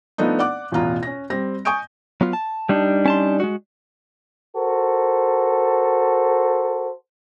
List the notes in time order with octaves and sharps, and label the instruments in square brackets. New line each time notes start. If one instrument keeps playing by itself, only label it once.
[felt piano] F3 A3 B3 D4 D#4
D5 F#5 D6 F#6
A1 E2 B2 F4 A#5
C#4 A#6
G3 C4 A#6
G#5 C#6 D#6 G6 D7
[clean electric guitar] F#3 B3 F4
A5
[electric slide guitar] G3 D4 D#4
[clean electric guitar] C#4 A5 C6
G#3 F#4
[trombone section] F#4 A4 A#4 C5